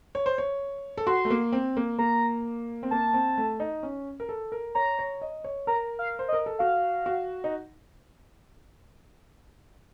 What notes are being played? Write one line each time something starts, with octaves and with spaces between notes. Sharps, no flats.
C#5
C5
C#5
A4
F#4 C6
A3
A#3
C4
A#3
A#3 A#5
C4
A#3 A5
C4
A3
D#4
C#4
A#4
A4
A#4
C#5 A#5
C#5
D#5
C#5
A#4 A#5
F5
C5
D#5
A#4
A4
F#4 F5
F#4
D#4